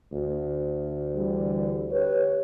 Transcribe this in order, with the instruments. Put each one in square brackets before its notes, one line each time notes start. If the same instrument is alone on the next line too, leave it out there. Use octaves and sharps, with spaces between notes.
[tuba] D2
[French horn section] D3 E3 G3
[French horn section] G4 C#5 [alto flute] B4